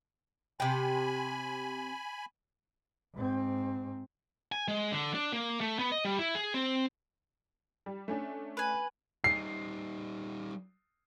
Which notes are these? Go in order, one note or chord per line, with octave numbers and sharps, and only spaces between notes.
C3 G5 G#5 B5
G#2 C4
G#5
G#3
D3
D4
A#3
A3
B3
D#5
G3
E4
G#4
C4
G3
A3 C#4 D4
B4 G#5
G3 D#4 C7